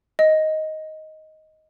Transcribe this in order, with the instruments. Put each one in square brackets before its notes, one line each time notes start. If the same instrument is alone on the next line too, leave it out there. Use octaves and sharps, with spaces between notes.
[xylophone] D#5